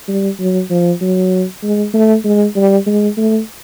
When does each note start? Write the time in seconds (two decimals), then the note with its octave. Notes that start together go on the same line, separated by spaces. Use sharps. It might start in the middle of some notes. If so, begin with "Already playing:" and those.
0.08 G3
0.40 F#3
0.70 F3
1.01 F#3
1.63 G#3
1.94 A3
2.24 G#3
2.56 G3
2.87 G#3
3.17 A3